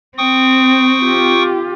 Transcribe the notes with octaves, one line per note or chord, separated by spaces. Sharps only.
C4 G5 C#6 D#6
F4 G4